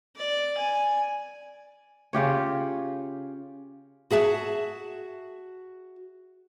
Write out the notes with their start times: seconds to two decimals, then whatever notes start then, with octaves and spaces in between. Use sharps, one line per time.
0.16 D5
0.57 G#5
2.13 C#3 F4 G4 C#5
4.11 F#4 G#4 E5 A5